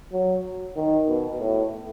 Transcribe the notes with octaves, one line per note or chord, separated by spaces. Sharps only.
F#3
D#3
B2
A2